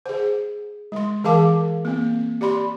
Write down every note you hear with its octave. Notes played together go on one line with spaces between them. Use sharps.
G#4 C5
G#3 C6
E3 G#4 A#4 F5 A5 D6
A#3 C4
G4 D5 B5 C6